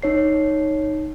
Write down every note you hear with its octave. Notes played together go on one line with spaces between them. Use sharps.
D#4 C#5 C7